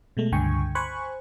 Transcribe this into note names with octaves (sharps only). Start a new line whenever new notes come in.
B2 G#3 A3
C#2 G2 D3 G5 G#5 C#6
C5 G#5 B5 C#6 F#6